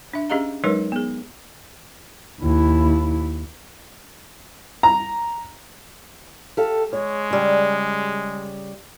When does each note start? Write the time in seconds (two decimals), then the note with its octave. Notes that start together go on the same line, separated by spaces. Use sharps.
0.14 D4 E5
0.30 C#4 G4 G#4 D#5 F5 A#5
0.64 F#3 G#3 D#4 A#4 B4 C#5
0.92 B3 G#4
2.40 D#2 E4
4.83 A#5
6.57 G4 A4 F5
6.93 G#3 C#5
7.31 C#3 G3